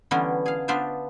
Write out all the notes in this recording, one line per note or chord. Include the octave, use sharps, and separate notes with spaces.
D3 E3 G3 B3 C#4 D4
G#4 F5
B3 D4 F4 C5 E5